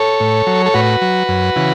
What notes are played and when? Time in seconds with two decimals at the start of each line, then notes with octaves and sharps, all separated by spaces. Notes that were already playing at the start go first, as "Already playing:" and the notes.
Already playing: A4 C#5
0.20 A2
0.47 F#3
0.66 A4
0.74 A2 F#4 B4
1.02 F#3
1.29 F#2
1.56 C#3 E3